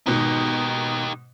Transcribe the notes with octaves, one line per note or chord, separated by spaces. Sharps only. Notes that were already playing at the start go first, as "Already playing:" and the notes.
G#2 B2 D#3 D#4 G4